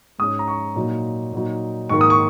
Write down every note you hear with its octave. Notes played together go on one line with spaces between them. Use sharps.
G#2 G#3 C#4 D#6
A#5
C#6
A#2 F#3 D#4
A#2 F#3 D#4
G#2 D#3 A#3 C#6
D#6
C#6